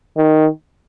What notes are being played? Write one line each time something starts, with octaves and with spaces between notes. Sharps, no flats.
D#3